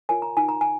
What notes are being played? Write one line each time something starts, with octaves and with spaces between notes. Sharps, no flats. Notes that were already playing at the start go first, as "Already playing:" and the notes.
F4 A#4 C#5 G#5
A#5
D#4 G#5
A#5
G#5